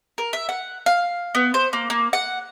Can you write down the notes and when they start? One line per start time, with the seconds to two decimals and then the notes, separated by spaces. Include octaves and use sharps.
0.18 A#4
0.33 E5
0.49 F#5
0.86 F5
1.35 B3
1.54 C5
1.73 A#3
1.90 A#3
2.13 F#5